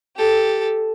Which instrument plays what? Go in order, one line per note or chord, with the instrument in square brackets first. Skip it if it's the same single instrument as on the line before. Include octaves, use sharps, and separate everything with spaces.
[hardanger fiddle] G4 A4